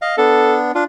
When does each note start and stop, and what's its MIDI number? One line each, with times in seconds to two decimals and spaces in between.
0.02 0.16 75
0.02 0.16 77
0.18 0.72 59
0.18 0.72 62
0.18 0.57 69
0.75 0.84 62
0.75 0.84 65